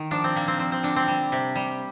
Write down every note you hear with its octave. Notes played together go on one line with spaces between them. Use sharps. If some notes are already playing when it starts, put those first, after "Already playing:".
Already playing: D#3
F3 D4
C4
A#2 A#3
C4
F3 C4
C4
D3 D4
C4
G3
C3
G3